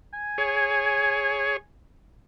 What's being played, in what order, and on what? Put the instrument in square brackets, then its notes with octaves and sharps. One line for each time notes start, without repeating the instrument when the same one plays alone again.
[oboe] G#5
[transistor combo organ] G#4 C#5